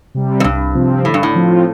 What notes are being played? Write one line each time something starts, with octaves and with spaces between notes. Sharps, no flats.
C3 G3
F2
C2 G2
C3 F3 C4
A2 D3
G2
A2
F3 C4 F4